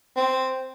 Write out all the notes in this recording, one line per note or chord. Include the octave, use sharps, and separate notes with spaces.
C4